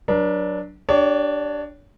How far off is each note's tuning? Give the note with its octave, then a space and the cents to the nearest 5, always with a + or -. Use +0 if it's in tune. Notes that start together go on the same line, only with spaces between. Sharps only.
F#3 +0 D4 +0 B4 -45
D4 +0 G4 +0 C#5 +30